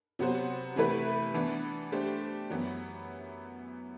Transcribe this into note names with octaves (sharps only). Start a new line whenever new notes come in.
C3 F#3 B3 F#4 C5
C3 E3 A3 E4 B4
E3 B3 D4
A3 D4 G4 C5
F#2 E3 B3